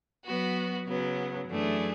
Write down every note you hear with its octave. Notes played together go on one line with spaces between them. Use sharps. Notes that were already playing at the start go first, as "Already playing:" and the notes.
F#3 B3 F#4 B4
C#3 F#3 B3
F#2 E3 A3 D4 G#4